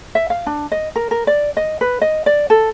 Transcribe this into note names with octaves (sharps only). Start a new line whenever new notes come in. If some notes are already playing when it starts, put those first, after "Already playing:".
E5
F5
D4
D#5
A#4
A#4
D5
D#5
B4
D#5
D5
A4